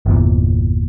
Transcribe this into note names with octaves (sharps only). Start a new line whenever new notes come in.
G1 E2 A#2